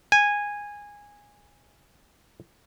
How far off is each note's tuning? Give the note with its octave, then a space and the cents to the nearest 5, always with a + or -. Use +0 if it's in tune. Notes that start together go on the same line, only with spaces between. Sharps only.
G#5 -15